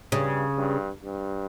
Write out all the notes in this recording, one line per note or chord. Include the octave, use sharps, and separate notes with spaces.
G2 C#3
G2
G2